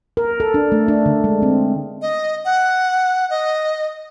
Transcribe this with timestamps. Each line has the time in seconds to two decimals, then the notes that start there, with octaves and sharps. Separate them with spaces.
0.17 A#4
0.40 A4
0.54 D4
0.72 A3
0.88 D4
1.06 D3
1.24 G#3
1.42 C4
2.02 D#5
2.45 F#5
3.30 D#5